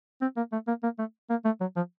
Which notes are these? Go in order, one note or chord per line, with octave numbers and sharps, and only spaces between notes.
C4
A#3
A3
A#3
A#3
A3
A#3
A3
F#3
F3